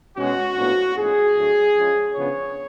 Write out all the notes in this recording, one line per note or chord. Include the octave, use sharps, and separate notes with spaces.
B2 G#3 C#4 F#4
A2 F3 B3 D4
A2 F3 G#3 C#4 G#4
A2 F#3 A3 D4
F3 G#3 C#4
C#3 F3 B3 D4 C#5